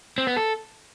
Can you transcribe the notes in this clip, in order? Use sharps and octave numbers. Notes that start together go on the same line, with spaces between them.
C4
B3
A4